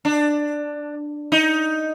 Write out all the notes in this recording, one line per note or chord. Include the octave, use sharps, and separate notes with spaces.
D4
D#4